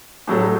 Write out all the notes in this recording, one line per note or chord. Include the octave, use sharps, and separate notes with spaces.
A2 F#3 A3